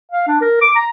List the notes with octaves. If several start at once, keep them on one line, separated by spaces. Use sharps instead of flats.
F5
D4
A#4
D6
A#5